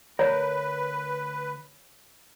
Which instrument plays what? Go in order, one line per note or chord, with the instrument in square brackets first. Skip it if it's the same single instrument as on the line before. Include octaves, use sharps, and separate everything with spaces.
[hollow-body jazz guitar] D2 A#4 [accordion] B4 [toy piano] C#5